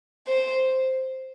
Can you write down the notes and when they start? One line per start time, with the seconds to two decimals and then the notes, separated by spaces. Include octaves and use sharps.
0.27 C5